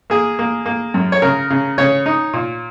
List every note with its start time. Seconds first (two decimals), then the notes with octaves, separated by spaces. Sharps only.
0.10 A#3 G#4
0.39 A#3
0.66 A#3
0.94 F#2
1.12 C#5
1.22 C#3 A#4
1.51 C#3
1.78 C#3 C#5
2.06 D#4
2.33 A#2